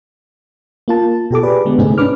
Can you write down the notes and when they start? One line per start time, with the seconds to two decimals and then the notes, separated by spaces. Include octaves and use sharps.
0.88 A#3 F4 A5
1.31 B2 G4 A4 D6
1.43 G4 G#4 B4 D5
1.65 D3 G#3 B3
1.78 G#2 C3 A3 C4 D#4 G#4
1.98 C#4 D4 B4 D6 F6